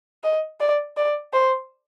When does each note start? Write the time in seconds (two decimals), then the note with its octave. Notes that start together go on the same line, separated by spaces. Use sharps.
0.24 D#5
0.60 D5
0.97 D5
1.33 C5